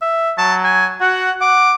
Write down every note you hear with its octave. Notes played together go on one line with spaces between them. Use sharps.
E5
F#3 A5
G#5
F#4 F#5
F#5 D6